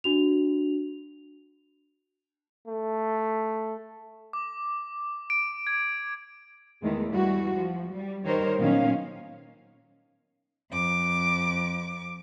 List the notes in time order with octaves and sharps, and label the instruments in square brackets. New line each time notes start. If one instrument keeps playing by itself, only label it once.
[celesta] D4 F#4 F7
[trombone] A3
[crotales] D6
D7
G#6
[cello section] E2 D#3 G#3 A3
E3 G3 F#4
F3
G3
D#3 G3 D#4 A#4 C5 C#5
A#2 D#3 F#3 B3 C#4 F5
[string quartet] F2 D6